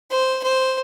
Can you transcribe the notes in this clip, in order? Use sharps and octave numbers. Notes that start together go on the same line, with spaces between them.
C5
C5